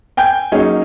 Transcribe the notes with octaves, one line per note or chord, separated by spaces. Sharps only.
G5 G#5 G6
F#3 A#3 C#4 D#4 G#4 C#5